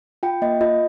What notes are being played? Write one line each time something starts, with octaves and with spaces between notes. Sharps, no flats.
F4 G5
A#3 D#5
F4 D#5